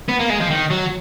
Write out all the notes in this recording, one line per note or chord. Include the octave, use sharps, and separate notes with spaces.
B3
A#3
G#3
F3
D#3
F#3